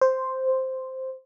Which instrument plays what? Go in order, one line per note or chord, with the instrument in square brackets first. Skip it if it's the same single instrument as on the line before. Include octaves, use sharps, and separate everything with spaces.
[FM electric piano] C5